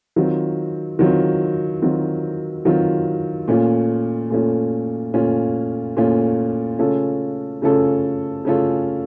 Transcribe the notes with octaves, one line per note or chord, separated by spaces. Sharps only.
D#3 F#3 C4 F4
D#3 F#3 C4 F4
D#3 F#3 C4 F4
D#3 F#3 C4 F4
A#2 A3 C#4 F4
A#2 A3 C#4 F4
A#2 A3 C#4 F4
A#2 A3 C#4 F4
C#3 A3 C#4 F4 A4
C#3 A3 C#4 F4 A4
C#3 A3 C#4 F4 A4